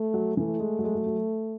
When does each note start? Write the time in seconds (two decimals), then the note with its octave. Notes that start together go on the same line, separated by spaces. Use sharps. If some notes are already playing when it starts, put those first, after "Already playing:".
Already playing: A3
0.14 F#3
0.37 E3 A3
0.60 G#3
0.79 F#3
0.84 G#3
0.95 F#3
1.07 F#3